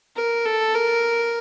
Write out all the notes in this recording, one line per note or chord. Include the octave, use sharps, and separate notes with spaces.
A#4
A4
A#4